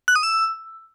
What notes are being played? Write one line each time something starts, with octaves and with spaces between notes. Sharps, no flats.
F#6
D#6
E6